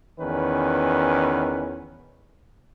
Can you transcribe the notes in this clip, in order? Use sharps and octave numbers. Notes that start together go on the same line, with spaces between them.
E2 D#3 C#4 B4